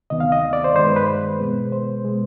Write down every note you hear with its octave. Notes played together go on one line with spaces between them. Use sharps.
D2 C3 D#3 B3 D#5
F5
D#5
D5
C5
G2 D#3 G#3 C5
B4
B4
B2 G#3 B3
C5
B2 G#3